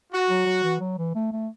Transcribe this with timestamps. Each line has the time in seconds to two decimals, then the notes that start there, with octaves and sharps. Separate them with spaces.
0.12 F#4
0.29 F#3
0.46 F#3
0.63 E3
0.80 F#3
0.98 E3
1.15 A3
1.32 A3